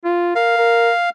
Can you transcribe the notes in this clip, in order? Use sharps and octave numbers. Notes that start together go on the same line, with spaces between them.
F4
A#4 F5
A#4